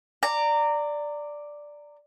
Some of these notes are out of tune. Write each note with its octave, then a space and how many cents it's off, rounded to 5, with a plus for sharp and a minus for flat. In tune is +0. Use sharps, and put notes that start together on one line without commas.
D5 +0 A#5 -20